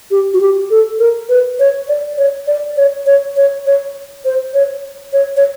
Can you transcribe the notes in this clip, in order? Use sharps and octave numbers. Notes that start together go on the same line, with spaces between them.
G4
F#4
G4
A4
A#4
B4
C#5
D5
C#5
D5
C#5
C#5
C#5
C#5
C5
C#5
C#5
C#5